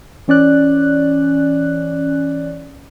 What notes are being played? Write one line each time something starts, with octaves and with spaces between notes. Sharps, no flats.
E3 C#4 D5 F#6